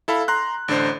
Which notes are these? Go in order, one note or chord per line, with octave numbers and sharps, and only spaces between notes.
E4 A4 F5 B5
A#5 C6 F#6
A1 D3 D4 C5